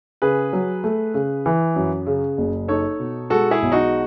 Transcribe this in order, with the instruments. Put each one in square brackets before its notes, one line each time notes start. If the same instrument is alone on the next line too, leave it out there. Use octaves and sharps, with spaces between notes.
[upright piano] C#3 [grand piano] G#4 B4
[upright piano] F#3
A3
C#3
E3
F#2
C#3
F#1
[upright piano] D#4 [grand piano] A4 C#5
[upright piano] B2
[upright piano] G#3 [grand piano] F#4 A4
[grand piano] E4 G#4
[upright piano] B1
[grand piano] D#4 F#4